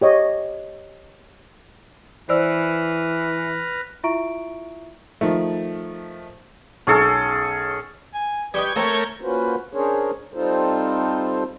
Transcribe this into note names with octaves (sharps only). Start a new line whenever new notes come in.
G4 C#5 D#5
E3 B4 C5 D5 E6 F6 A#6
E4 F4 E5 A#5 C#6 D7
D#3 F3 A3
B1 C#4 G#4 A4
G#5
G3 D4 G4 B4 D#5 C#6 G6 G#6
A3 A#3 C4 A#4 C#5 A#5
A#3 C#4 F4 F#4 B4 C5
C#4 D4 G#4 A#4 C5 C#5
G3 C4 D#4 F4 A4 C5